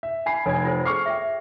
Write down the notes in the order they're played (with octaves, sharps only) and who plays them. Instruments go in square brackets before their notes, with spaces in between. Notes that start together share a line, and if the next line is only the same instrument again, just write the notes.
[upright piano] E5
G#5 B5 C7
[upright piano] F1 G#6 [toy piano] A4 C#5 G#5
[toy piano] F4 A4 C5
[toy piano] G#4 D6 [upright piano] C#6 F6 C7
[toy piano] E5 G5